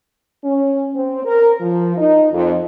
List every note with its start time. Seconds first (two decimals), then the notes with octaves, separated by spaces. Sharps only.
0.44 C#4
0.95 C4
1.25 A#4
1.61 F3
1.98 D#4
2.33 F2